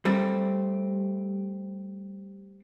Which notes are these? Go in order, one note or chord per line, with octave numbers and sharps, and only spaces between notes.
G3 A3 C4